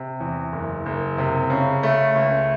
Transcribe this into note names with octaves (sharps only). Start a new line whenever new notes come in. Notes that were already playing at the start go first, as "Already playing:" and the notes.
Already playing: C3
E2
F#1
F#1
C3
C#3
A3
C#2